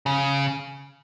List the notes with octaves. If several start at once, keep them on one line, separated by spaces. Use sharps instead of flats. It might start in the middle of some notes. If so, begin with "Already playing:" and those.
C#3